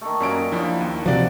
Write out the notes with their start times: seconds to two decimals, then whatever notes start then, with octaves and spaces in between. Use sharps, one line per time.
0.01 D#3 A3
0.20 F#2 A#2 F#3 C#4 D7
0.52 F3 D4 E4
0.81 D#2
1.06 C3 F3 F#4 D5 D7